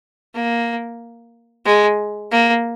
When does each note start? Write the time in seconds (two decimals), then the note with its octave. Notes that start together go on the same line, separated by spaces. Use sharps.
0.34 A#3
1.65 G#3
2.32 A#3